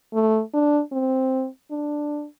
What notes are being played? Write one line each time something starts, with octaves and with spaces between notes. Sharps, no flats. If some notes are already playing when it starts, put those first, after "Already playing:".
A3
D4
C4
D4